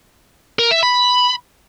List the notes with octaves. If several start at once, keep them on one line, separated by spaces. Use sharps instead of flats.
A#4
E5
B5